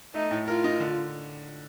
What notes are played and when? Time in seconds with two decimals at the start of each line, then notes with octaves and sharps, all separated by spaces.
0.15 A3 D#4
0.31 A2
0.47 F4 A#4
0.64 D#4
0.80 D3